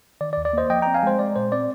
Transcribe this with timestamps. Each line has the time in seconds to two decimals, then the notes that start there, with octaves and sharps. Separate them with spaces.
0.21 D#3 D5
0.33 D5
0.37 D#2
0.45 D5
0.53 A#3 C5 D#5
0.70 F3 D#5 G5
0.82 C4 G5 A#5
0.94 F5 G#5
1.03 G#3 C5
1.19 G#3 D5
1.36 A#2 C5
1.52 C4 D5